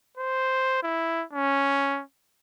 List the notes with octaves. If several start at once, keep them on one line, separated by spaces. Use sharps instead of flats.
C5
E4
C#4